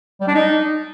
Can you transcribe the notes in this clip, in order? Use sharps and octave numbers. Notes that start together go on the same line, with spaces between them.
G3
D4
D#4